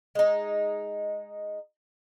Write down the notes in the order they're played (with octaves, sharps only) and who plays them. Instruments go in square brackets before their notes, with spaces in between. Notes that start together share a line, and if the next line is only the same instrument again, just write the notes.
[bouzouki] G#3 D#4